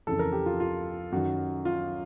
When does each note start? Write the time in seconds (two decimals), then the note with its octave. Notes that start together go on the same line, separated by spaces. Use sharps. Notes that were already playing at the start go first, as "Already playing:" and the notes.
0.07 F2 C#3 E3 A4
0.19 A#4
0.33 G4
0.46 F4
0.60 F4
1.12 F#2 D#3 F#4
1.65 F4